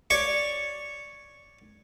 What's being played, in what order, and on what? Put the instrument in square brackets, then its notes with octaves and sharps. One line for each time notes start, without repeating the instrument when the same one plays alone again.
[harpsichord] C#5 D5 C#6